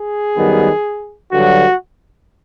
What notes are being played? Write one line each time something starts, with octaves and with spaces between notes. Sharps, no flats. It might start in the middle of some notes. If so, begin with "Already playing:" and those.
Already playing: G#4
F#2 D#3 G3 B3
G2 D3 F#3 F#4